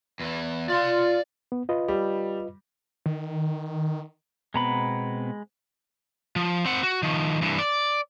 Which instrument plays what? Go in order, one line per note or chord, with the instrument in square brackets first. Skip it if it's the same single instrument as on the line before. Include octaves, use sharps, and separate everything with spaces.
[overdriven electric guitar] E2 E3
[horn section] F4 [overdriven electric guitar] D5 C6
[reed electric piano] B3
F4 B4 D#5
[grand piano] G3
[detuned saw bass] D#3
[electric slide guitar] B2 B3 C4 [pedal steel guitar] G#3 A#5 B5
[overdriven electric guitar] F3
C4 F#5
F#4
D#3 F3
G2 E3
D5